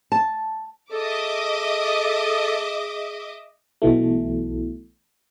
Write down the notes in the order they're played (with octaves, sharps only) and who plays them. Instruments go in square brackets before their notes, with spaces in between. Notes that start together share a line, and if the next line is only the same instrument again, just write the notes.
[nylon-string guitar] A5
[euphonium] G#4 [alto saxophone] A4 [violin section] D#5 E5 D6
[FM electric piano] B1 B2 E3 A3